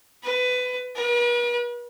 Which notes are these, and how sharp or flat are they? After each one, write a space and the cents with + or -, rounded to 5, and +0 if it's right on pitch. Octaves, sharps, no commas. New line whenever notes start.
B4 +20
B4 -45